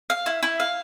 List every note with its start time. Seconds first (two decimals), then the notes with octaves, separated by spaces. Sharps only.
0.10 F5
0.26 E4
0.43 E4
0.60 F5